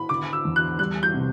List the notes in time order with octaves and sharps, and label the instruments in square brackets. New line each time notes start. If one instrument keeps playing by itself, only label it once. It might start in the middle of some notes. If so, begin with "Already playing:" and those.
Already playing: [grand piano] E4 [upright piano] B5
[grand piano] D3 [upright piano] D6
[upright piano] E6
[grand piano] E2
[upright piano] F#6
[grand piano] G3 [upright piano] F#6
[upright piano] G6
[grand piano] C3